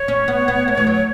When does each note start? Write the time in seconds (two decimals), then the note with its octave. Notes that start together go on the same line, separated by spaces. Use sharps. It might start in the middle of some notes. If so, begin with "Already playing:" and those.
Already playing: C#5
0.08 C#4
0.28 B3
0.48 B3
0.68 A3
0.77 E3
0.87 F#3